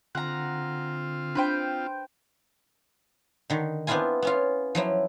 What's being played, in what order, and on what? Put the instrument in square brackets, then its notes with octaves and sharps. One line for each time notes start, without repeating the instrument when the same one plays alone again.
[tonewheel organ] D3 [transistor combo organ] C4 F4 [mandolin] F#5 A#5
[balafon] D4 [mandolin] B4 C5 G5
[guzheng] D3 D#3
B3 C4 D4 E4 F4 G#5
B3 C#4 F4
F3 F#3 E4